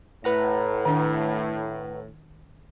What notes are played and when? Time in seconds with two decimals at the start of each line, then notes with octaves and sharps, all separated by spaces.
0.24 A2 B4 F#5 A#5
0.85 D#3 D4